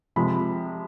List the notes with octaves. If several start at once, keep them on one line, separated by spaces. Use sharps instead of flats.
C3 F3 G#3 B5